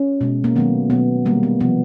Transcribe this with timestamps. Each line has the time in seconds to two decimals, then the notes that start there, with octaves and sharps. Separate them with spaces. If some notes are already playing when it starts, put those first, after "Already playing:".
Already playing: C#4
0.21 B2 G#3
0.44 A#3
0.56 D#3 F#3 A3 B3
0.90 B2 F#3 A#3 B3
1.25 C3 D#3 G3 A#3
1.43 B3
1.60 C3 F3 A#3 B3